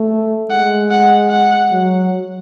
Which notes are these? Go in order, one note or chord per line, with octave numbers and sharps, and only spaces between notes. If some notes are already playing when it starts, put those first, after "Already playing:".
Already playing: A3
G#3 F#5
F#5
F#5
F#3